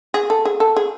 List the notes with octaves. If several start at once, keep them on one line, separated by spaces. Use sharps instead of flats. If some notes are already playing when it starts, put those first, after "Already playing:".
G#4
A4
G#4
A4
G#4